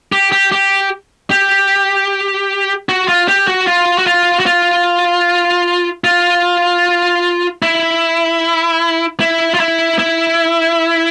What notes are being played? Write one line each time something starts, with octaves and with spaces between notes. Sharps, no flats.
G4
G4
G4
G4
F#4
F4
G4
F#4
F4
F#4
F4
F#4
F4
F4
E4
E4
F4
E4
E4